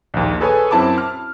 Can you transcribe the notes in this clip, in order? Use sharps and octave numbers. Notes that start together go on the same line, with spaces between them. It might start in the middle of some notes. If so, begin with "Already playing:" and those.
A#1 D#2
G#4 A4 B4 C#5 G#5
F#2 C4 E4 A5 B5 D6
F6